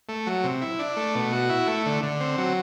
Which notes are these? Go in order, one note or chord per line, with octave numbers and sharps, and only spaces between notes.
A3
F#3
C3
E4
D4
A3
B2
F#4
E4
A3
D3
D3
C4
F#3